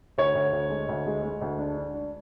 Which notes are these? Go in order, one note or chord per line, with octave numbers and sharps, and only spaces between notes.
D2 C#5
D2
D2
G#3
D2
G#3
G#3
D2
D4
D4
D4